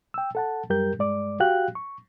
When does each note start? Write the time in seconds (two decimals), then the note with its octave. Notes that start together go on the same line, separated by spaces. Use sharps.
0.14 G5 E6
0.35 A4 F#5 A5
0.70 F#2 G3 G4 A#4 G6
0.99 G2 G#3 D5 D6
1.40 F#4 G4 F5 G5 F#6
1.75 C#6